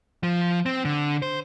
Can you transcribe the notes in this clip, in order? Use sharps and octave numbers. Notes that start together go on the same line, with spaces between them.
F3
C4
D3
C5